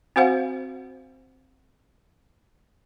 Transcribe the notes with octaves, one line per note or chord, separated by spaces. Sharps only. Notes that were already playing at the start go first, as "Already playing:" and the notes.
C4 F#4 C5 F5 F#5